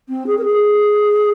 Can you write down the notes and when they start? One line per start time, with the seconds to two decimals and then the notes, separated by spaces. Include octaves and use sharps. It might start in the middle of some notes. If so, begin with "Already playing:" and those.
0.09 C4
0.26 G#4
0.38 A#4
0.45 G#4